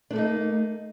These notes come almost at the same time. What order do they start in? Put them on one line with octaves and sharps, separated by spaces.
D4 A3 A#3 D#4